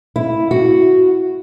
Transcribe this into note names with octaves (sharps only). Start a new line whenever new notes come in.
E4
F#4